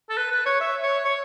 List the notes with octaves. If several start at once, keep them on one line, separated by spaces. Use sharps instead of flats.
A4
B4
B4
C#5
E5
C#5
C#5